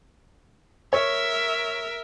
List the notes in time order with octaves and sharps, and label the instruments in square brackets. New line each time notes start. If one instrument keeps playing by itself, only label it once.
[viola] A#4 E5 [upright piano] C#5